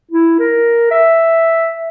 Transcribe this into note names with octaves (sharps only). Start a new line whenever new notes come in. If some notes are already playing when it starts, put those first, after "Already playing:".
E4
A#4
E5